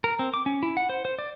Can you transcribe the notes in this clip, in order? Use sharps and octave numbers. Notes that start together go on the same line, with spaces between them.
A#4
C4
D6
C#4
E4
F#5
C5
C5
D5